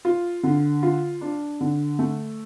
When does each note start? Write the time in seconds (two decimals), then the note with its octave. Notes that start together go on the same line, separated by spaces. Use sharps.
0.05 F4
0.43 D3
0.83 F4
1.21 D4
1.61 D3
1.99 A3